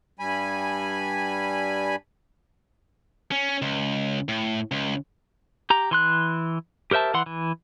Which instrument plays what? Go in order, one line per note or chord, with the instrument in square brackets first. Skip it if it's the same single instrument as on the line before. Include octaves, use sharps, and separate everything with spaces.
[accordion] G2 G3 G#5 B5
[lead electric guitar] C#4
C#2
A2
C#2
[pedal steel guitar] G4 A#5
E3 C6 F#6
G4 A#4 C5 E5 A5
E3 F#5 C6
E3